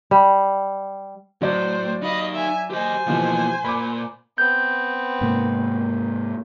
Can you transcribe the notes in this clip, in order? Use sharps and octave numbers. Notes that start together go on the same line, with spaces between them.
G3
A2 F#3 C5 D5
D#4 D#5 F5 B5
E5 G#5
G4 C5 D#5 G#5
B2 E3 F3 A#3 G4
A#2 B5 D6
B3 C4 G6
G#2 C3 A#3